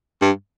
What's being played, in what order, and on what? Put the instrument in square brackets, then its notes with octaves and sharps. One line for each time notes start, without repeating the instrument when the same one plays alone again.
[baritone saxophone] G2